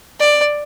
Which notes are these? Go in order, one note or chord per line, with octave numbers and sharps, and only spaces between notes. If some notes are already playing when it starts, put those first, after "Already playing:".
D5